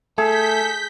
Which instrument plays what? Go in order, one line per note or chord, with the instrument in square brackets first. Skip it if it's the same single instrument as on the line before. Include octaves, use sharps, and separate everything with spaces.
[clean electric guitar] A3 [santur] G#4 [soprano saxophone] A4 [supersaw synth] G6 B6